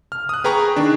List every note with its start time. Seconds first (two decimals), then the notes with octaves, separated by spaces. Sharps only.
0.12 F6
0.29 D#6 F#6
0.44 G#4 B4 G5 A#5 C#6
0.76 D#3 D4